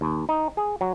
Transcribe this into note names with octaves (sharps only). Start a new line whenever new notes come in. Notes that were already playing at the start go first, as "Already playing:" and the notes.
D#2
D#4
G#4
F#3